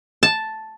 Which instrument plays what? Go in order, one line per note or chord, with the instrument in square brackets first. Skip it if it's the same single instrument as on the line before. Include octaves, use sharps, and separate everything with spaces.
[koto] A5